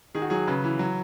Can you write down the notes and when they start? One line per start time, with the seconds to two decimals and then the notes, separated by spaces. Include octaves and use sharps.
0.15 D#3 G#4
0.22 F#4
0.30 F#3 G#4
0.47 C#3 B4
0.64 E3
0.79 F#3